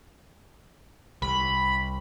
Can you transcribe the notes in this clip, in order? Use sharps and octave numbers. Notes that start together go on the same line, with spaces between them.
C2 B5